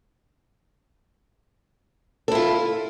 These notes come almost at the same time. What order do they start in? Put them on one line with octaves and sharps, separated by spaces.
A4 E4 F4